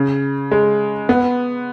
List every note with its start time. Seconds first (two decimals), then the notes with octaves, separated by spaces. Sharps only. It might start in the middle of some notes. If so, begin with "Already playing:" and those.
Already playing: C#3
0.51 G#3
1.09 B3